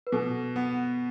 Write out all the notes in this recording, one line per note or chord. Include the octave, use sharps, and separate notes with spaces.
B4
B2 A4
B3